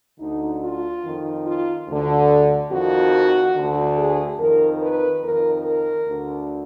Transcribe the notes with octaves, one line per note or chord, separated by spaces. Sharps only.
D2 D3 D#4
F4
F2 D#3
F4
D2 D3
F2 D#3 F#4
D2 D3
G#4
F2 D#3 A#4
B4
F2 D#3 A#4
A#4
D2 D3